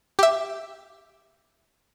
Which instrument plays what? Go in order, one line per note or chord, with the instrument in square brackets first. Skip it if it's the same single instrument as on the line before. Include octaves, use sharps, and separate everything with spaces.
[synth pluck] G4 E5